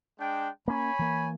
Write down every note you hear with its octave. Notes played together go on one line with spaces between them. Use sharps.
G#3 D4 G5
A#3 C#4 C#5 G#5 B5
E3 A#3